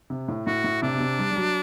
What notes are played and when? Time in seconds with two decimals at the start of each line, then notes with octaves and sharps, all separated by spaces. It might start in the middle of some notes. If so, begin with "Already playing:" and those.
0.10 C3
0.28 A2
0.47 A2 F#4
0.64 A2
0.82 C3 D4
0.95 B2
1.00 C3
1.19 G3
1.31 G3
1.36 F#3